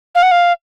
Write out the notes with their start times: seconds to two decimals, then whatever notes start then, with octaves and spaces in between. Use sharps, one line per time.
0.15 F5
0.23 F#5
0.31 F5